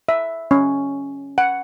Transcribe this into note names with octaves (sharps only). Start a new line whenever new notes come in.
E5
C#4
F#5